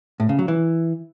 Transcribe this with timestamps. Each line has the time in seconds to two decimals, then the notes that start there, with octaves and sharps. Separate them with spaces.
0.20 A2
0.29 C#3
0.39 F#3
0.48 E3